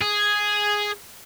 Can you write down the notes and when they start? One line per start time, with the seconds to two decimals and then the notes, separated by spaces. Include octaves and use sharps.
0.01 G#4